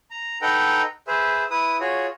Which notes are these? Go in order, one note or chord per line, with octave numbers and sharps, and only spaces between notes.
A#5
D#4 A4 B4 F#5 G5 A#5
G#4 B4 C5 E5
E4 B4 D#6
F4 F#4 G#4 C#5